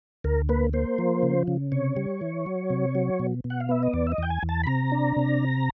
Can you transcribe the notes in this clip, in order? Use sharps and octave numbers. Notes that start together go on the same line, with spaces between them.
D2 A#4
A#3 B4
A#3 C5
F3
C#3
C#3
C3 C#5
G3
E3
F#3
C3
F#3
B2
B2
F#5
F5
B3 E5
D#5
E2 D5
E5
D#5
E2 G5
G#5
E2
A5
B5
C3 A#5
D4
C3